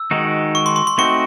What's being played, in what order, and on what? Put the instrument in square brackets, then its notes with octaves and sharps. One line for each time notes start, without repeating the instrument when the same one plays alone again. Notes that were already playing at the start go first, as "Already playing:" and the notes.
Already playing: [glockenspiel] E6
[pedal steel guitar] D#3 G#3 D#4 F#4
[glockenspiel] C#6
C6
C6
C6
[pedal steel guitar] A3 C4 D#4 F#4 [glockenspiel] C#6